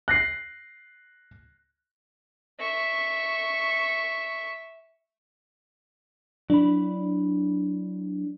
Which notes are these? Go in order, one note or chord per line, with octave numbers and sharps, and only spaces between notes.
F#6 A#6 C7
E5 C#6
F#3 D4 E4 B5